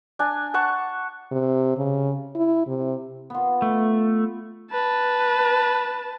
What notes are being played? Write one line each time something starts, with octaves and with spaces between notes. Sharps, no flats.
D4 G#5
F#5 A5 C#6
C3
C#3
E4
C3
B3 F4
A3
B4 A5